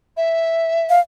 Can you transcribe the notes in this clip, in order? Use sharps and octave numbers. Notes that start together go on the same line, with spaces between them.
E5
F5